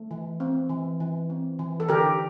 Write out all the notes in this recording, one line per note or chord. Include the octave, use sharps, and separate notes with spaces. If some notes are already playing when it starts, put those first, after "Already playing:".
Already playing: A3
E3
C4
E3
E3
C4
E3
A4
D3 G4 A#4